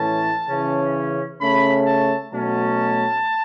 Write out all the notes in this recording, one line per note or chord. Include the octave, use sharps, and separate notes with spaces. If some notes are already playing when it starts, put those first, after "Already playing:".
Already playing: A2 E3 A3 C#4 A5
C#3 E3 C#4
C#3 A3 C#4 B5
A5
B2 F#3 A3 C#4 A5